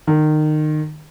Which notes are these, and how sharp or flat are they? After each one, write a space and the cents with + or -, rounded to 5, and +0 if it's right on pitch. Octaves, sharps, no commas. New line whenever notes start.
D#3 -25